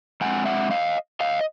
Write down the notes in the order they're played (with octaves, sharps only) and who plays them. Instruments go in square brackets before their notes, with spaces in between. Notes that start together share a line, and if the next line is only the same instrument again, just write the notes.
[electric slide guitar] G2 D#3 G#3 C4 F#5 G#5
E5 F#5
D#5 F5
D#5 F5